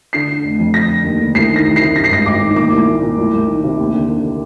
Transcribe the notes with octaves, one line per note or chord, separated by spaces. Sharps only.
D3 C7
D3
F1
F2
D3 A#6
D3
D#2
D3
C2 C7
D#3
A#6
C2
C7
C3
G2 A#6
C7
G#1 A#6
G#1 D6
D#3
A#2 D6
C2
A#2
A#2
C2
C2
D#3
C3
D#2
D3
D3